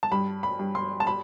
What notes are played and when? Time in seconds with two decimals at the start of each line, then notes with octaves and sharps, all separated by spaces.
0.03 A5
0.11 G2 B5
0.43 B5
0.59 G2
0.75 C6
1.00 A5
1.07 B5